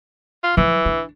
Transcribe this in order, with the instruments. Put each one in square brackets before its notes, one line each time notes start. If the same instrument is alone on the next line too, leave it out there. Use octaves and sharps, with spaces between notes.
[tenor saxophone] F4
[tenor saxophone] E3 [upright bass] F3
[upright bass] D4